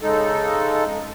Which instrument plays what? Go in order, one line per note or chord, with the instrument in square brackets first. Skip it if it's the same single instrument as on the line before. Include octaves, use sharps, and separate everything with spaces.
[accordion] C#3 G#3 D#4 A4